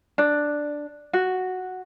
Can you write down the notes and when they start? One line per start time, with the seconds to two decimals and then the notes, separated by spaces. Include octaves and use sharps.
0.18 D4
1.13 F#4